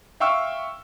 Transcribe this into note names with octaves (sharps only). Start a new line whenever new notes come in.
E5 F5 G5 C#6 E6 F6